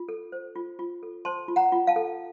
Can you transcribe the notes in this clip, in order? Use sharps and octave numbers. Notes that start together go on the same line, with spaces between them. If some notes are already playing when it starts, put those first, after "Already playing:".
Already playing: F4
A4
C5
F4
F4
A4
C5 A5 C6
F4
F#5 A#5
F4
F5 A5
A4